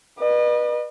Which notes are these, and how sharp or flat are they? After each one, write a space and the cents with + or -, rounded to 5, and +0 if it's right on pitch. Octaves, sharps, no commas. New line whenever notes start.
B4 -25 D#5 -40